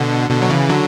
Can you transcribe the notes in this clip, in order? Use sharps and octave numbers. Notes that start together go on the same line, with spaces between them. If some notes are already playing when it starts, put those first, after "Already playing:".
Already playing: B2 D3
B2 D3
F#3
C#3 E3
D3 F#3